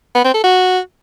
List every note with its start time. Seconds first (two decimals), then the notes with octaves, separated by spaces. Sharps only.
0.15 B3
0.24 C4
0.34 A4
0.44 F#4